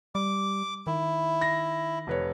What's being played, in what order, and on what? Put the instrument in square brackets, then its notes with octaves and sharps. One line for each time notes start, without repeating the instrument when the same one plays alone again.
[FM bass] G3 [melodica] D6
[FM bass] D#3 [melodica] E4
[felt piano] A#6
F1 B4 C#5